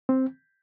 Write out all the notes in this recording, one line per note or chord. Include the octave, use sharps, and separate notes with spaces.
C4